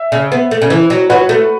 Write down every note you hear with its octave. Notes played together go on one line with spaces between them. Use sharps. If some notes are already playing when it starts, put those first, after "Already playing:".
Already playing: E5
C#3
B3
A3
C#3
E3
F#3
F#3 F#4 B4
A3